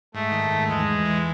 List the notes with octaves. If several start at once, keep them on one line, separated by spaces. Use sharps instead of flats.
G#2 A3
D#3
G#2
E2 G#3
E2
E3